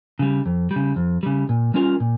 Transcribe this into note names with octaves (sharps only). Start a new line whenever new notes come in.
C#3 G3
F2
G3
C#3
F2
C#3 G3
A#2
G3 C#4 F4 A#4
A#2